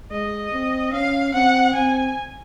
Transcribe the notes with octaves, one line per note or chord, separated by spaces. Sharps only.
G#3 D#5
C4
C#4 F5
C4 F#5
C4 G#5